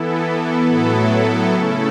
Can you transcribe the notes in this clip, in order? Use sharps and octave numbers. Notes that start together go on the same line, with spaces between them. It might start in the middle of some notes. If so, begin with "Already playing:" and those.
Already playing: E3 B3 E4 A4
A2 F#3 B3 E4 A4
C#3 A3 C#4 E4 A4